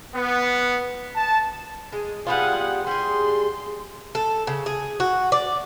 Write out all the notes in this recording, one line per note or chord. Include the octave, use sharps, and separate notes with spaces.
B3
A5
G#3
G3 B3 F4 G#4 F#5
G3 G#4 C6
A4
C#3
G#4
F#4
D5